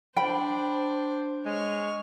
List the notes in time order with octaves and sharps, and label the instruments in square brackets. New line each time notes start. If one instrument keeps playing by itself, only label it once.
[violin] D4 C5 [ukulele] G5 B5
[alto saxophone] G#3 [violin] C#5 F6